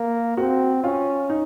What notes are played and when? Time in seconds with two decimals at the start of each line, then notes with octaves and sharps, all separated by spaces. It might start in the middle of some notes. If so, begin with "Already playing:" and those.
Already playing: A#3
0.37 C4 F#4
0.84 C#4 F4
1.30 D#4